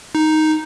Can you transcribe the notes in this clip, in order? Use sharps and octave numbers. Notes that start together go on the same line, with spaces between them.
D#4